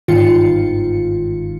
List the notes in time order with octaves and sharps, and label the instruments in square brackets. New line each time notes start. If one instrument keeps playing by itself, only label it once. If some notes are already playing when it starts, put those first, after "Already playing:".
[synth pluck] G1 G#2 D#3 F4 C#7